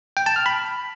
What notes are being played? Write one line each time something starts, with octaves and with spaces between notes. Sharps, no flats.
G5
A5
F6
B5